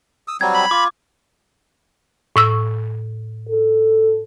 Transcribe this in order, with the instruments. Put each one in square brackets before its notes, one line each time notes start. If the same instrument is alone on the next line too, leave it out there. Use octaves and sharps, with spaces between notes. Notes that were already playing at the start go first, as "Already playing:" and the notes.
[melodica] D#6 E6
[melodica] F#3 G3 C4 [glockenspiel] G#6
[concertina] B5
[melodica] F4 [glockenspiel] D6
[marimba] A2 C#6 E6
[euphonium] A4